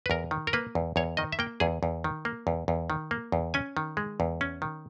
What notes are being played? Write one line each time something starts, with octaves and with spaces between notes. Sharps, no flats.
B4
E2 A#4
D#3
A#4
A#3 B4
E2
E2 C#5
D#3 D#5
E5
A#3 G5
E2 G#4
E2
D#3
A#3
E2
E2
D#3
A#3
E2
C#4 G#5
D#3
G#3
E2
C#4
D#3